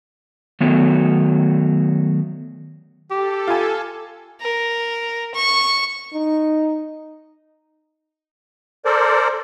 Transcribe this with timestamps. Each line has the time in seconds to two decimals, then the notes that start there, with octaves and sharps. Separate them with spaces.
0.61 D#3 F#3 A3 B3
3.11 G4 A4
3.47 F4 G#5
4.41 A#4
5.34 C#6
6.13 D#4
8.85 A4 A#4 C5 D5